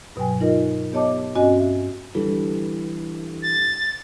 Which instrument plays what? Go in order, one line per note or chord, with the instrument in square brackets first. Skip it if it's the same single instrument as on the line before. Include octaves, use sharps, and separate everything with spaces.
[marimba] G2 B2 F#3 G5 G#5
D#4 F4 A#4 D#5
B3 G4 C#5 D#5 A5 D6
G2 C4 C#4 F#4 D#5 G#5
E5
[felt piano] D3 G3 A4 [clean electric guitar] E3
[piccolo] A6